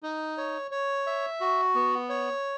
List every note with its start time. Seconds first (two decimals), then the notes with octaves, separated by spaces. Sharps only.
0.03 D#4
0.38 C#5
0.71 C#5
1.07 E5
1.40 F#4
1.75 B3
2.09 C#5